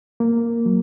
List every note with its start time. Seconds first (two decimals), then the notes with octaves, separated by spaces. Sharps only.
0.20 A#3
0.66 F#3